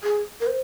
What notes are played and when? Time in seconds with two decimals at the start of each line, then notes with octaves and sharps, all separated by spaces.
0.03 G#4
0.41 A#4
0.47 C5